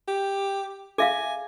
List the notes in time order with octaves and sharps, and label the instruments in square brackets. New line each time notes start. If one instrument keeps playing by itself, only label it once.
[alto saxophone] G4
[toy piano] G#4 E5 F5 [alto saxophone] G#5